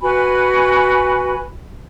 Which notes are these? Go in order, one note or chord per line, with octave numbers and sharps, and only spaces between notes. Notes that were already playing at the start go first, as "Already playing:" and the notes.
F#4 B4 G#5 B5